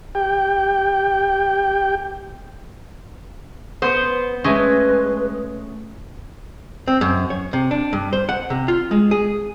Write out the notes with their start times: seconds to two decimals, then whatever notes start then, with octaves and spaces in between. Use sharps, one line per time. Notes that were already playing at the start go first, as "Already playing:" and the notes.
0.15 G4 G5
3.82 B3 C5 D#6 G6
4.44 G#3 A3 C#4 B4
6.88 C4
7.01 F#2
7.30 C#5
7.53 C3
7.71 D4
7.93 G2
8.13 C5
8.29 F#5
8.50 C3
8.68 F4
8.91 G#3
9.11 G#4